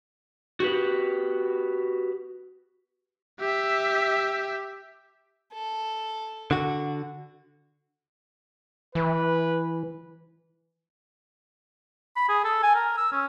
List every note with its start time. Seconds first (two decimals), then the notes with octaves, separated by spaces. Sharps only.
0.60 F#4 G4 B4
3.39 G4 E5
5.53 A4
6.51 D3 F#4
8.95 E3 B4
12.16 B5
12.29 G#4
12.45 A4
12.63 G#5
12.75 A#4
12.97 E6
13.12 C#4